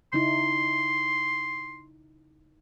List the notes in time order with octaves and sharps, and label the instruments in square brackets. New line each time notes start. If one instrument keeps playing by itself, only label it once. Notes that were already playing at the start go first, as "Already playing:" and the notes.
[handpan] C#3 D#4 E4 [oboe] C6